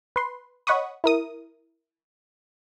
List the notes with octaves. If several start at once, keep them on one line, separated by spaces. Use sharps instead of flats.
B4 C6
C#5 D#5 F#5 B5 C#6 D#6
E4 A#4 D#6